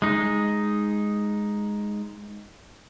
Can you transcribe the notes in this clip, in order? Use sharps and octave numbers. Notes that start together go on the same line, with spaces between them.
G#3 D#4